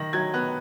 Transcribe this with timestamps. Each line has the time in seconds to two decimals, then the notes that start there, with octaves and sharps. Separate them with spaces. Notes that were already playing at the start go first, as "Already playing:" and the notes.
Already playing: D#3 A#6
0.13 F#3 G#6
0.34 B3 F#6